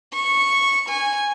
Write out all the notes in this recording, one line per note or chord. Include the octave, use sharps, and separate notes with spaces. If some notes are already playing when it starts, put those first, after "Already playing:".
C#6
G#5